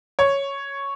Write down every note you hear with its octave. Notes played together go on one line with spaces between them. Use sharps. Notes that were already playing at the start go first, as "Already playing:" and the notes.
C#5